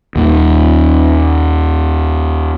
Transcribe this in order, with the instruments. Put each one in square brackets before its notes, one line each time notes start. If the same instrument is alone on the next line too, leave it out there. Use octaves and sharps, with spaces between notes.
[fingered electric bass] D#2 A#2